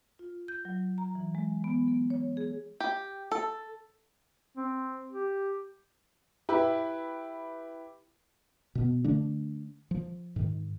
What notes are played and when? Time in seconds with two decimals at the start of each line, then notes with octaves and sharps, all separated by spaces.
0.19 F4
0.48 G6
0.65 F#3
0.98 A#5
1.15 E3
1.35 G#3
1.64 B3
1.88 B3
2.10 C#5
2.37 G#4
2.80 G4
3.31 A4
4.57 C4
5.11 G4
6.49 E4 G4 B4
8.75 B2 B3
9.04 D3 A3 D4
9.91 F3
10.36 G#2 D#3